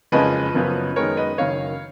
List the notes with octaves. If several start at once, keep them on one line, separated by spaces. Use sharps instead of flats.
F#1 F2 F3 G#3 C#4 B4 D#5
F#1 F#2 F3 B3
F#2 D#3 G#3 B3 A#4 C#5
B4 D#5
F#1 F#2 D#3 C#5 F5